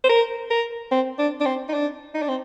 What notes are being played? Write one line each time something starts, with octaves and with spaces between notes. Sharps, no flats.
C5
A#4
A#4
C4
D4
D4
C4
D#4
D4
D#4
D4
C4